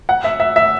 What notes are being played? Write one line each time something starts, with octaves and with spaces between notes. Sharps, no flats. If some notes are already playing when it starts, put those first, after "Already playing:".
F#5
E5
E5
E5